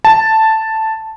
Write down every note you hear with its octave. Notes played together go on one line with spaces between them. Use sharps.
A5